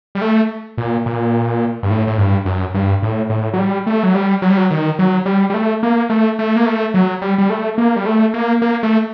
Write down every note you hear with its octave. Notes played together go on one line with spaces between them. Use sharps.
G3
A3
A#2
A#2
G2
A2
A2
G2
F#2
G2
A2
A2
F#3
G3
A3
F#3
G3
F#3
G3
F#3
D#3
F#3
G3
G3
A3
A#3
A3
A3
A#3
A3
F#3
G3
G3
A3
A#3
G3
A3
A#3
A#3
A3